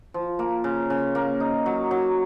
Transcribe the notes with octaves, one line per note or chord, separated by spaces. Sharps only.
F3
A#3
C#3
C#3
A#3
D#4
F#3
F#3